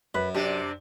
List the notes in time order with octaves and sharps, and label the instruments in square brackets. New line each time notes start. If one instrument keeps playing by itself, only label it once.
[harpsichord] F#2 [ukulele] B4
[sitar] C3 D4 [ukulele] G4